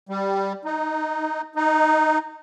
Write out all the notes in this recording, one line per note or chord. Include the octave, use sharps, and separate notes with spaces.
G3
D#4
D#4